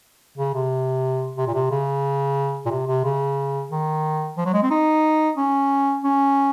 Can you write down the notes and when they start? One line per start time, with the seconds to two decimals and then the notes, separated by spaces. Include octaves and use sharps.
0.38 C#3
0.54 C3
1.37 C3
1.47 A#2
1.54 C3
1.71 C#3
2.66 A#2
2.71 C3
2.87 C3
3.04 C#3
3.71 D#3
4.37 F3
4.46 F#3
4.54 G#3
4.62 C4
4.70 D#4
5.37 C#4
6.04 C#4